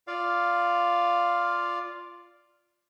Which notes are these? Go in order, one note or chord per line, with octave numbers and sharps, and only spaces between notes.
F4 D5 F5